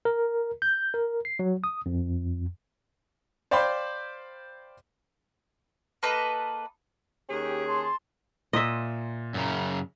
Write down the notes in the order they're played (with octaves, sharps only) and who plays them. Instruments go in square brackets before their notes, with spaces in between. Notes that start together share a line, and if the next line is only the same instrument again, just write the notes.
[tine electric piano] A#4
G6
A#4
C7
F#3
D#6
F2
[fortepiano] C5 D5 F5 G5 B5 C6
[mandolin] A#3 A4 B4 D#5
[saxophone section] D#2 C#4 G#4 [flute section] G4
[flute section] A5 C6
[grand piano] A#2 A#5 C6 [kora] D#5 E5
[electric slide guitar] F#2 C#3